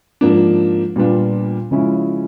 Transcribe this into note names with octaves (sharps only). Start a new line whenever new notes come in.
G#2 F3 A#3 D4
A#2 G3 B3 D4 F4
C#3 F3 G#3 C#4 E4